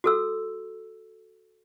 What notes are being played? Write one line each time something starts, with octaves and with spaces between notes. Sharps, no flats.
F#4 A4 E6